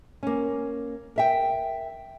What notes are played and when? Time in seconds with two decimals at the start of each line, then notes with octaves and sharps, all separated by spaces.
0.23 A#3 C#4
1.16 A#4 E5 G5